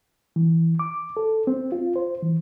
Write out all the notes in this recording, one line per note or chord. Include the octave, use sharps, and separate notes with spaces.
E3
D6
A4
C4
F4
C5
E3